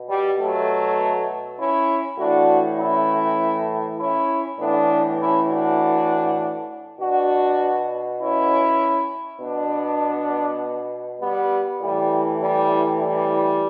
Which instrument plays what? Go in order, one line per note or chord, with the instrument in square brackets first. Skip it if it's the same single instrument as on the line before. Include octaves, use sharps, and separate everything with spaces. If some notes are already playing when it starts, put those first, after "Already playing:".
Already playing: [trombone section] B2
G3
F#3 A3
C#4 E4
A2 E3 D4 F#4
C#4 E4
C#4 E4
A2 E3 B3 D4
C#4 E4
D4 F#4
B2 D4 F#4
C#4 E4
B2 B3 D4
G3 B3
A2 E3 G3
G3
G3